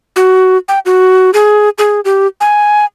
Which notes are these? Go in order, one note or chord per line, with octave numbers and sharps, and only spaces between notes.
F#4
G5
F#4
G#4
G#4
G4
G#5